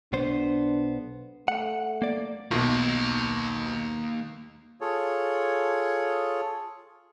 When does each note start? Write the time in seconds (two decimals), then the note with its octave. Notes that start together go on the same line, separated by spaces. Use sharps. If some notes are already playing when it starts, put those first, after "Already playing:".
0.13 B1 B3 D4 C5
1.48 A3 F#5
2.02 A#3 D5
2.51 B1 B2 A#3 D#4
4.81 F4 G#4 A4 C#5